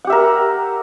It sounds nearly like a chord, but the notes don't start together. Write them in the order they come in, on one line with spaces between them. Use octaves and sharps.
F#5 G4 E5 A#4